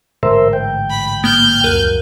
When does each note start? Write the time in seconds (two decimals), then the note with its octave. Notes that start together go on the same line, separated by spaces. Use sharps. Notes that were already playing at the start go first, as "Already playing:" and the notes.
0.23 A1 G#2 D3 A#4 C5 E5
0.53 G5
0.90 B5
1.24 A#3 F6 G6
1.64 D#1 C#2 F#2 A#4 F#6